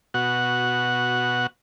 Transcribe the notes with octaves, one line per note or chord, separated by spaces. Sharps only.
B2 F#4 F#5